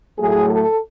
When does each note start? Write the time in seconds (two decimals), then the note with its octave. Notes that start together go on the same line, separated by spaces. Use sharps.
0.19 A2 F#3 A3 G#4
0.50 A4